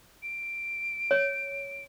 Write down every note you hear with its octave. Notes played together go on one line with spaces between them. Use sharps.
D7
C#5